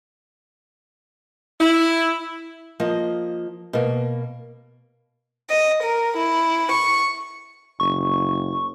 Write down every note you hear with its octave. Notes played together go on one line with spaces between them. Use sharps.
E4
F3 A#3 D#5
B2 A#3
D#5
A#4
E4
C#6
F#1 C#6